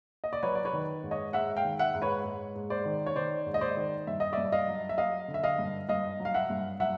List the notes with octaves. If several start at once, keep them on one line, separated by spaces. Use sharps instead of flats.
D#5
D5
F#3 B4 C#5
D5
B4 C#5
D#3
G#2
C#5 D#5
G#2 E5 F#5
F5 G5
D#3
E5 F#5
G#2
B4 C#5
G#2
G#2
C5 D5
D#3
C#5
D#3 C5 D5
G#2
D#5
C5 D5
D#3
G2 E5
D#5
G2 D5 E5
D#5 F5
F#3
E5
F#3 D#5 F5
D3
E5
D#5 F5
G2
G2 D#5 F5
F#3
F5
E5 F#5
G2
F#3 E5 F#5